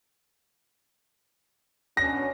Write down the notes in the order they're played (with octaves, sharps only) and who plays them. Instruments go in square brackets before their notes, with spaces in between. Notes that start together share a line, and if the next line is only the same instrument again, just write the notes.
[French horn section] B2 C#4 D4 [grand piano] A#6